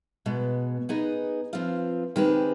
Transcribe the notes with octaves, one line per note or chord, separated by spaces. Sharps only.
B2 G#3 B3
B3 D#4 G#4 B4 D#5
F3 C4 F4 B4
D#3 G#3 C4 G4 B4